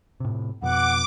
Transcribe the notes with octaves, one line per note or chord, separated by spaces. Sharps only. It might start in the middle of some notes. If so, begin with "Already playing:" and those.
A2 C3
F2 B2 F#5 D6